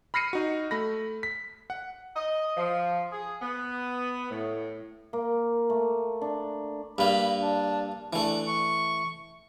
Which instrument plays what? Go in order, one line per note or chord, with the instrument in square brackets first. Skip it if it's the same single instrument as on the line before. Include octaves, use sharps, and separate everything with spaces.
[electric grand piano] B5 F6 A#6 C7 C#7 D#7
D#4 F#4
A3 B5 A#6
B6
F#5
[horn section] D#5
F3
G#4
B3
A2
[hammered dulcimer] A#3
A3
D4
[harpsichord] G2 A#3 [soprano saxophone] B5
[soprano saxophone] D4
[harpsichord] E3 A3 [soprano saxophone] D4
[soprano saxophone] C#6